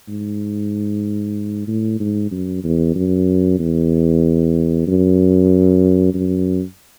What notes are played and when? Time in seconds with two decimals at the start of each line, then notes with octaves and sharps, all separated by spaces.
0.08 G#2
1.67 A2
2.00 G#2
2.31 F#2
2.64 E2
2.95 F#2
3.59 E2
4.87 F#2
6.14 F#2